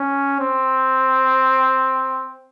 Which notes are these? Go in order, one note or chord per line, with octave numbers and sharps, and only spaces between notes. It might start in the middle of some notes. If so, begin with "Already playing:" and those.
Already playing: C#4
C4